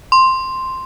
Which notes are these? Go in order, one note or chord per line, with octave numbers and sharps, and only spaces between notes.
C6